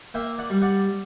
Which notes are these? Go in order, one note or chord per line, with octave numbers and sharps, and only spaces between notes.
A#3 E5 G5
D5 F#5
G3
D5 F#5